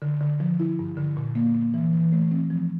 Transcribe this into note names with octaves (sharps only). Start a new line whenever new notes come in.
D3
D3
F3
E4
G2
D3
A#2
A#3
A#3
E3
E3
A3
C4
F3